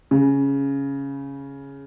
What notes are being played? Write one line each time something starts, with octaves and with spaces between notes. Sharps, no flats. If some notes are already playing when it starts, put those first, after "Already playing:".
C#3